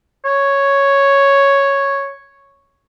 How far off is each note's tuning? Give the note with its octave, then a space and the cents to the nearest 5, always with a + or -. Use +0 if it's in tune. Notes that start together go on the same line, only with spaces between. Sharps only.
C#5 +0